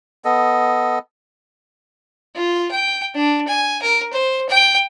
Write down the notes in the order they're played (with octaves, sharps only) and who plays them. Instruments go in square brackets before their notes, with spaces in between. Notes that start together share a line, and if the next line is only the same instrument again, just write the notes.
[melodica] B3 A4 D#5
[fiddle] F4
G5
D4
G#5
A#4
C5
G5